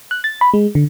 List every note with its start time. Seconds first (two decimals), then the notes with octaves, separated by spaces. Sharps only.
0.11 F#6
0.24 A6
0.41 B5
0.54 G#3
0.75 D3